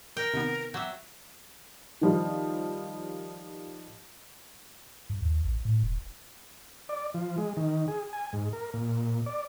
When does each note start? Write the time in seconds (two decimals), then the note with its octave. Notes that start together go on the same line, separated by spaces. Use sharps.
0.17 A#4 G5
0.34 C3 D#3 B3
0.74 F#3 G4 E5
2.01 D#3 F3 G3
5.10 G2
5.22 D#2
5.44 A1
5.65 A2
5.83 E1
6.89 D5
7.14 F3
7.38 G#3
7.57 D#3
7.88 G#4
8.13 G#5
8.33 G#2
8.53 A#4
8.73 A#2
9.26 D5